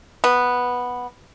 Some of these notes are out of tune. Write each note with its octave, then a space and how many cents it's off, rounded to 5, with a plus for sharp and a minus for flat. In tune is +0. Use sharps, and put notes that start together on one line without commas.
B3 -5